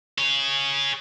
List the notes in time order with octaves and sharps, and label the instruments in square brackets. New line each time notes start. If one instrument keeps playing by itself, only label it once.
[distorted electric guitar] G#4 C#5